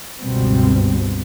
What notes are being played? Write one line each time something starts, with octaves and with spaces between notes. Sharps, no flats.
G1 C#2 G2 B2 G3 C4